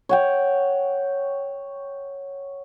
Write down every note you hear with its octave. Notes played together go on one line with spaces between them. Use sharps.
C#5 F#5 G5